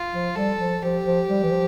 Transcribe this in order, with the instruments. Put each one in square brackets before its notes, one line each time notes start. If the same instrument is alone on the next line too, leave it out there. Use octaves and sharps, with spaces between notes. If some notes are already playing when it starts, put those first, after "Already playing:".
Already playing: [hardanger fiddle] F4
[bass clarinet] F3
[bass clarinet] G3 [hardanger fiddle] A4
[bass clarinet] F3
[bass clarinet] F3 [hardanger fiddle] G4
[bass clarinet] F3
G3
E3
F3